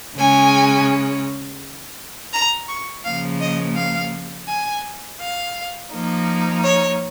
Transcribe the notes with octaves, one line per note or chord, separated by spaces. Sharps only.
C#3 G#3 C#4 G#5
A#5
C#6
C#3 F3 A#3 F5
D#5
F5
G#5
F5
F3 A#3 D#4
C#5